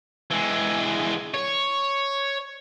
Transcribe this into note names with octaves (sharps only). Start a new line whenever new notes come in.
E3 G#3
C#5